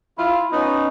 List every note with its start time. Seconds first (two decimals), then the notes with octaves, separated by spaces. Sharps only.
0.17 E4 F4
0.51 B3 C#4 D#4